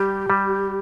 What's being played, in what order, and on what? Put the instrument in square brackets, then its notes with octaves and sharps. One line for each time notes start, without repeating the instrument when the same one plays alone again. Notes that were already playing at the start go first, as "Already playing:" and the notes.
Already playing: [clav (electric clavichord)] G3 [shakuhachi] G4
[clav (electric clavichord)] G3